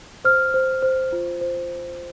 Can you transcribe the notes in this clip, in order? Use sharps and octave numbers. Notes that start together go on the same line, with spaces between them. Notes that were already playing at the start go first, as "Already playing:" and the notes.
C5 F6
C5
C5
F4
C5